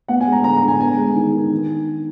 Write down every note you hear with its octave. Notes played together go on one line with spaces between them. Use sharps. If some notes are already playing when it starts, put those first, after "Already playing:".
B3 F#5
G#5
G#3
A#5
D3 A#5
A#5
D3
G#5
B3 G#5
G#3
D#3
D#3
D#3